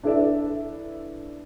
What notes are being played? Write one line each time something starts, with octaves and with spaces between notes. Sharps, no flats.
D4 E4 A4 B4 D5 E5